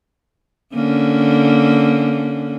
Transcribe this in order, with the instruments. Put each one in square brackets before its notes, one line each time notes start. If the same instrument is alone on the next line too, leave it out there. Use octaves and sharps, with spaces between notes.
[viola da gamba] D3 A#3 C#4